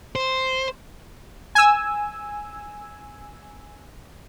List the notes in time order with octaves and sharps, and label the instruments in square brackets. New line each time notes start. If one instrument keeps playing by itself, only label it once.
[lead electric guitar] C5
[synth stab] G#5 E6